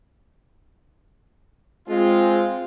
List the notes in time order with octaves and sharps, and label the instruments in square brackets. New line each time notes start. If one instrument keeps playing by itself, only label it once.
[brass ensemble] G#3 C4 F4